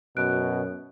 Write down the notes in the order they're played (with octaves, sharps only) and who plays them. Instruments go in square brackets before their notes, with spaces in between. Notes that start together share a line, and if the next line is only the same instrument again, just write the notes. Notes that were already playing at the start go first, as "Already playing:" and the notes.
[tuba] F#2 [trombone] B2 [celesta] F#6 D7